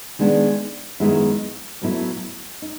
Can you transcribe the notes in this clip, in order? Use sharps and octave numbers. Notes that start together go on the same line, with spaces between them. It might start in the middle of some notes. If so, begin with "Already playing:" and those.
D#3 G#3 B3 D4
F#2 D#3 G#3 B3 E4
A2 F#3 B3 E4
D#4